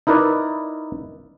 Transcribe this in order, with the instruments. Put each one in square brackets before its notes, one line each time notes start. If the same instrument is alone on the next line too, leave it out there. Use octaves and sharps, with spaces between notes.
[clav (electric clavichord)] D#4 E4 A#4 B4 D5